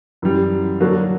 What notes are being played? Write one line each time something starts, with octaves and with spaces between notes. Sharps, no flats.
F#2 E3 G3
D3 F#3 A#3 D4 F#4